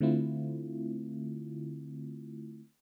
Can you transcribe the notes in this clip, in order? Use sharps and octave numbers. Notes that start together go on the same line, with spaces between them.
D3 A3 C4 E4 F4